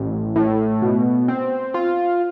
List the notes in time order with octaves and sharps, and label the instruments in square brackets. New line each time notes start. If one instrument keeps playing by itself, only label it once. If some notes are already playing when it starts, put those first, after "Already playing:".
Already playing: [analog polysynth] A1
A2
B2
C4
F4